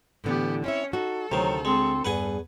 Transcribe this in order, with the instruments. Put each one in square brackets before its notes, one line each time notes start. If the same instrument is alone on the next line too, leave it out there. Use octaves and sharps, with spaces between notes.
[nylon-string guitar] A2 D3 E3 [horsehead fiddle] B3 G4
[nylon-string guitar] C4 E4 E5 [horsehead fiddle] C#4 C#5
[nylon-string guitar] D#4 F#4 [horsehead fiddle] A4
[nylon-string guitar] D2 [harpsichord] C3 D#3 [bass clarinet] F#3
[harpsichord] G#3 [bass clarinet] C4
[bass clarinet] E2 [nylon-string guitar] G2 G#4 [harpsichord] B4 F#5 G#5